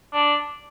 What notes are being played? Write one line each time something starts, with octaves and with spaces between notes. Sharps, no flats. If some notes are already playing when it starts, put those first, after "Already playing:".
D4